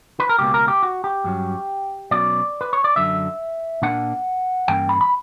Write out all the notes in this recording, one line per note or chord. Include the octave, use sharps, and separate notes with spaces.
B4
A#4
C#2 B2 A#3 C#4 G4
A#4
G4
F#4
G4
G2 F#3 C#4
B1 B2 F#3 C#4 D5
B4
C#5
D5
F#2 D3 F#3 E5
A#2 A#3 D4 F#5
G2 E3 A#3 C#4 G5
B5
B5